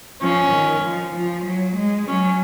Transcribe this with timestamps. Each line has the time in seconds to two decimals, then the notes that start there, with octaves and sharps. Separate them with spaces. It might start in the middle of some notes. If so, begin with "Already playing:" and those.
0.22 F3 C#4
0.53 D#3
0.83 F3
1.15 F3
1.45 F#3
1.77 G#3
2.07 F#3 C#4